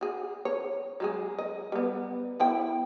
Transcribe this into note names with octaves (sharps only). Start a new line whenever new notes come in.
F#4 G#4
C#5
F#3 G#3 G#4
D#5
G3 B3
B3 E4 G5